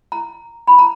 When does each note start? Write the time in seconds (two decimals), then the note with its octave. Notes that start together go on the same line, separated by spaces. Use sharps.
0.12 A#5
0.67 B5
0.79 A#5